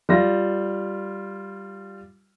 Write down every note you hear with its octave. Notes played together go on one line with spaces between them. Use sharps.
G3 F4 A#6